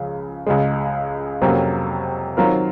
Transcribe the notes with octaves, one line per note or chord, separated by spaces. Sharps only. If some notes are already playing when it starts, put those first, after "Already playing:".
Already playing: C#2 C#3 F3
C#2 C#3 G#3
F2 C3 F#3 A#3 C#4
D#3 F#3 C4 F4 A#4